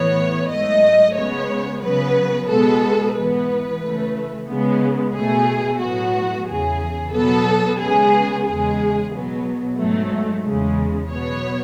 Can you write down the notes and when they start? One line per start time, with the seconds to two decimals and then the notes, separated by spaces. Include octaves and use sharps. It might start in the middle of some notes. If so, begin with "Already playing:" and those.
Already playing: A2 E3 B3 C#5
0.50 G#2 F#3 A3 D#5
1.16 C#3 G#3 B3 C#5
1.82 C#3 F#3 B3 B4
2.48 B2 G#3 B3 A4
3.15 G#2 E3 B3 B4
3.82 C#3 E3 A3
4.48 C#3 G#3 B3
5.15 B2 A3 G#4
5.80 A2 F#3 B3 F#4
6.47 E2 C#3 E3 G#4
7.13 B2 F#3 B3 A4
7.79 C#3 G#3 B3 G#4
8.46 E2 C#3 G#3 G#4
9.12 B2 F#3 B3
9.78 G#2 F#3 A3
10.44 E2 C#3 G#3
11.11 B2 F#3 B3 C#5